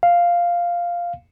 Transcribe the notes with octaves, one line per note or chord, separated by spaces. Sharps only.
F5